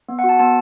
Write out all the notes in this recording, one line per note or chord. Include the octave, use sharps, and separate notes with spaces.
B3
F#5
F#4
A5
B3 A5